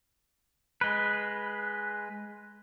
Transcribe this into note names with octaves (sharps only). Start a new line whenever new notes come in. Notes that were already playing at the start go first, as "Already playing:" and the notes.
G#3 B4